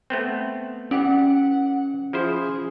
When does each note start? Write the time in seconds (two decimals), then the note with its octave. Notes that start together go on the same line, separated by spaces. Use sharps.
0.10 A3 B3 C4
0.91 E3 C#4 G4 D5 F#5
2.13 F3 E4 G#4 C5